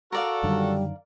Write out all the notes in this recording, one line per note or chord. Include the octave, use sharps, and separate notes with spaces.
F#4 A4 A#4 D5 F5
F#2 D3 D#3 G3